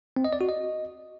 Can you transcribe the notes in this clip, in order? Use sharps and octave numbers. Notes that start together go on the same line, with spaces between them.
C4
D#5
D5
F#4
D#5